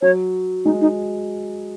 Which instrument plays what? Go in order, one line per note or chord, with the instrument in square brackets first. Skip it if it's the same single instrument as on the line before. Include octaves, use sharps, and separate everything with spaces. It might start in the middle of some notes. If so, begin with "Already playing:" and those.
[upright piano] F#3 [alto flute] C#5
[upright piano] G#3 [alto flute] D#4
[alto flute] D#4